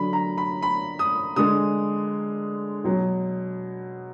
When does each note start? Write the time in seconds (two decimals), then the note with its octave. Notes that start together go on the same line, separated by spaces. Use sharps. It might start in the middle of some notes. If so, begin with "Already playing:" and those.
Already playing: D3 F#3 B5
0.13 A#5
0.38 B5
0.62 B5
0.99 D#6
1.36 D3 G#3 D#6
2.84 B2 F#3